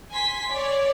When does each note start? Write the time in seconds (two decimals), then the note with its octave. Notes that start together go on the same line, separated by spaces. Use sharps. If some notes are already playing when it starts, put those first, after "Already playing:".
0.12 G#5 C6 B6
0.51 C#5 D5